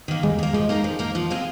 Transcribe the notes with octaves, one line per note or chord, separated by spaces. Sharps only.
D#3 A#3
D#2 G#3
D#3 A#3
F3 G#3
A#3 D#4 A#4
F3
A#3 D#4 A#4
F3
G#3 C4 F4 G#4